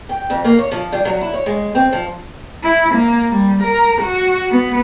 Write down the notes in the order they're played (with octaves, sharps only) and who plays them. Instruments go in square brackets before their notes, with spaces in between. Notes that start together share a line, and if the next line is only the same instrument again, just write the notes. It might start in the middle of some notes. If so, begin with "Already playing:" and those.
[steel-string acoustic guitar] G5
F2
A#3
C#5
F3
G3
F#3
E4
C#5
G#3
C4
F3
[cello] E4
A#3
G3
A#4
F#4
B3